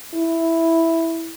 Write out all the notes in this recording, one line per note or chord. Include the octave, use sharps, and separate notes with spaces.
E4